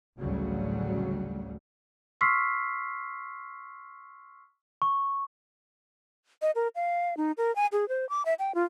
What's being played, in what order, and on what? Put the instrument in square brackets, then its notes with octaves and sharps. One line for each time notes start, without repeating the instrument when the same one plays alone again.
[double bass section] A1 D2 C#3 F#3 G3
[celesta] C6 C#6 E6 F6 B6 C7
[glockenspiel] C#6
[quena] D#5
A#4
F5
D#4
A#4
G#5
G#4
C5
D6
E5
G5
F4